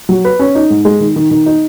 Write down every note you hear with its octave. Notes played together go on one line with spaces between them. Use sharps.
F#3
B4
C#4
D#4
G#2
G#3
D#3
D#3
D#3
D#4